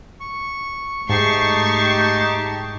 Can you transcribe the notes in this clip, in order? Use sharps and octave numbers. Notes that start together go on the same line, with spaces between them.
C#6
G#2 A3 D#4 G4 A5 C#6 C7